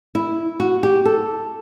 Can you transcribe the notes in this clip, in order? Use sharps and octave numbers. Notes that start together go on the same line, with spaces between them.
E4
F#4
G4
A4